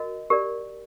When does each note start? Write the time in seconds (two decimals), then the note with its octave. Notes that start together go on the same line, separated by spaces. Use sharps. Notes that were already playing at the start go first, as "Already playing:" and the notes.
Already playing: F#4 A#4 D#5
0.30 G4 A#4 D5